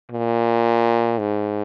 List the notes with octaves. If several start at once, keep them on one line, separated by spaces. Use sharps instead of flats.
A#2
G#2